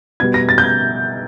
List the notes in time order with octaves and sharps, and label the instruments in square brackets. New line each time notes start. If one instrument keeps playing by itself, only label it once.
[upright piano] B2 G3 B3 G#6
A#6
A6
G6
G#6